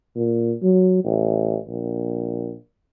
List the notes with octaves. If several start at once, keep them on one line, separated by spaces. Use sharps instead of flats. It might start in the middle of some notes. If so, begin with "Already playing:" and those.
A#2
F#3
A1
A#1